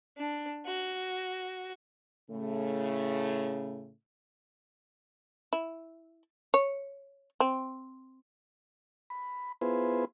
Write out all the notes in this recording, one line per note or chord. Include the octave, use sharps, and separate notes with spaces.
D4
F#4
A2 C#3 A3
E4
C#5
C4
B5
B3 E4 F4 G#4 B4 C5